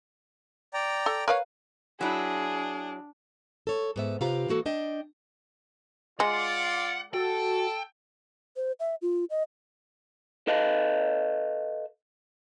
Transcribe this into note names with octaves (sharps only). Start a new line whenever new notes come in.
D5 G5 A#5
A4
A#4 B4 C#5 F5
F#3 D4 E4 G#4
A4 C#5
G#2 B3 E5
C3 F4 G4 B4 F5 A#5
E3 A#3 F#4 A4
D4 D#5 G5
G#3 F4 D5 F#5
F#4 A4 G5
C5
E5
F4
D#5
A4 B4 D#5 F5